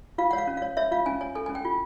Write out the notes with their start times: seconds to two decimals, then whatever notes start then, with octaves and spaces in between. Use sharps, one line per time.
0.18 F4 F5
0.31 C#5 F#5
0.38 F5
0.47 C#4
0.57 F5
0.62 C#5
0.77 C#5 E5
0.91 F4 F5
1.06 C#4 G#5
1.21 C#5 G#5
1.35 A4 G#5
1.46 C#4 G#5
1.55 G5
1.65 F4